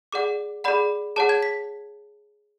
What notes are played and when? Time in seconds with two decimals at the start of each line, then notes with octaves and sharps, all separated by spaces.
0.12 G#4 D5 F#5 D6
0.64 G#4 D5 F#5 B5
1.16 G#4 C#5 F#5 A5
1.29 G#6
1.43 B6